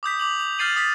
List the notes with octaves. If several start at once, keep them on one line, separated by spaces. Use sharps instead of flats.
D6 D#6 G6 B6
D6 F7 F#7
F7
F6 G6 A6 C7 D#7 F#7
D#6 A6 B6